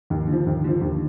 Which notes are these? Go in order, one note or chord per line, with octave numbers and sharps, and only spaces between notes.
D#2
D3 F3
D#2
D3 F3
D#2